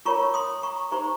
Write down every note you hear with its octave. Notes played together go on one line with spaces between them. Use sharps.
F4 A#4 C#5 A#5 C#6
C6 D#6
A#5 C#6
D#4 G4 C5 A#5 C#6